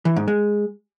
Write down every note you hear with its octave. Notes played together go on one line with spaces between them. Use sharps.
E3
G#2
G#3